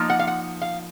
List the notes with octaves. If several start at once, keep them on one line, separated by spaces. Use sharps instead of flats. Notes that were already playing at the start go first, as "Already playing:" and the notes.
Already playing: F3 A#3 D#4
F#5
F5
F#5
F5